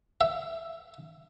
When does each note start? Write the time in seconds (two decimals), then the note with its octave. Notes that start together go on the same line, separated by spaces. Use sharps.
0.21 E5